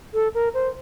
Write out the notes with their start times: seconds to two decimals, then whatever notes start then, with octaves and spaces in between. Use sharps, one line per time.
0.14 A4
0.35 A#4
0.54 C5